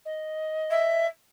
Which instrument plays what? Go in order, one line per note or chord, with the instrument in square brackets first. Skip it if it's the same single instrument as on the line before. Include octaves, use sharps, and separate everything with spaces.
[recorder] D#5
[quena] E5